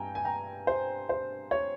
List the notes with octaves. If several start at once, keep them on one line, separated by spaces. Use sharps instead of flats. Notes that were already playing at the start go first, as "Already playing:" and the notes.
Already playing: G2 G5 G#5 A#5
G#5
G5 A#5
C5
C5
C#5